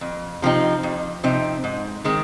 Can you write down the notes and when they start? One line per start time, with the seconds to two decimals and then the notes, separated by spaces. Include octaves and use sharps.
0.01 F2
0.42 C3 F3 C4 D#4
0.83 F2
1.24 C3 F3 C4 D#4
1.64 G#2
2.05 D#3 G#3 C4